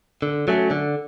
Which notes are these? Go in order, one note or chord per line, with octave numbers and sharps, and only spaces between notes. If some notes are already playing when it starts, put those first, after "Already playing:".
D3
F#3 A3 C#4
D3